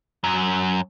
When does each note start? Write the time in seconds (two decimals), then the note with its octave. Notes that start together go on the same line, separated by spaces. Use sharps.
0.24 F#2 F#3